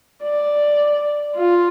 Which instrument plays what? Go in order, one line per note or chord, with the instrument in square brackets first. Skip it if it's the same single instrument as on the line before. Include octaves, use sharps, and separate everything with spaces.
[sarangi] D5
F4